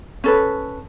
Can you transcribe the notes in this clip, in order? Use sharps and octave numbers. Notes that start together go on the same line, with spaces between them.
C#4 A4 B4